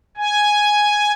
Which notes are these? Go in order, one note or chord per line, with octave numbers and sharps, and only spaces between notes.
G#5